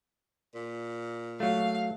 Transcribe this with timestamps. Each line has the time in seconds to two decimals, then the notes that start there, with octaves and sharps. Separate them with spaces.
0.55 A#2
1.40 F#3 A3 F5